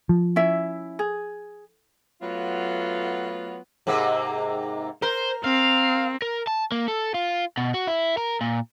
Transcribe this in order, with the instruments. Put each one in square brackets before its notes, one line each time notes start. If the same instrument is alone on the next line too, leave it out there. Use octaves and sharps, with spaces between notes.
[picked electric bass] F3
[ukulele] C#4 E4 E5
G#4
[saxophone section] F#3 A3 B3 F4
[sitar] G#2 C3 A#3
[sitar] A#4 [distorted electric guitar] C5
[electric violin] C4 [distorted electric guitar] F5
[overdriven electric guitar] A#4
A5
A#3
A4
F4
B2
F#4
E4
A#4
A#2